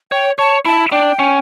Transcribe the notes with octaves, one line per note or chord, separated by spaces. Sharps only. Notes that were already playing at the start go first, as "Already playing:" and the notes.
C#5 G5
C#5 A5
E4 A5
D4 G5
C#4